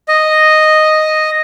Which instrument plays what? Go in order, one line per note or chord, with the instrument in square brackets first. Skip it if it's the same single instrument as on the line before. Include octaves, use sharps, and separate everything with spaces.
[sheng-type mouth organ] D#5